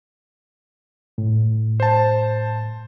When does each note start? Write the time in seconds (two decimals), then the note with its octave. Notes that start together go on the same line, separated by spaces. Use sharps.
1.18 A2
1.80 C5 A5